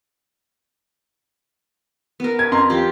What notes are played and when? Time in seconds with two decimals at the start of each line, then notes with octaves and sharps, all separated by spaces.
2.20 B3 A#4
2.39 G#6
2.52 F2 A#5 C6
2.70 F3 G4